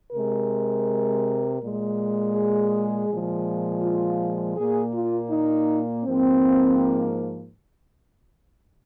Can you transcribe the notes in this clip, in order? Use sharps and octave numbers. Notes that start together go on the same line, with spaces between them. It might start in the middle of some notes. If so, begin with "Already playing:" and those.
C3 G#3 A#4
A#2 G#3
G#4
A#2 F3 G#3
F4
A#2 A#3 G#4
F4
D#4
G#2 F3 A#3 C4